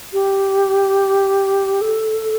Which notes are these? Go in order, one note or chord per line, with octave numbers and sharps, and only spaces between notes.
G4
A4